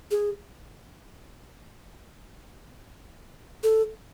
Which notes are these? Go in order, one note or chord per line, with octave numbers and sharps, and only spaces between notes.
G#4
A4